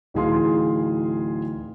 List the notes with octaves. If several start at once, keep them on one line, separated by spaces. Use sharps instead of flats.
D1 E3 D#4 G#4 F5 C6